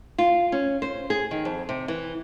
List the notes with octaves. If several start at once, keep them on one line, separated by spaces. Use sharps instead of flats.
F4
C#4
C5
G#4
D#3
F2
C3
E3